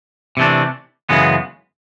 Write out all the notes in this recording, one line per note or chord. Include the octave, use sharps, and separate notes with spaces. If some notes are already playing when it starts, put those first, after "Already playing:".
C3 E3 A3 D4
F#2 C#3 E3 G#3 B3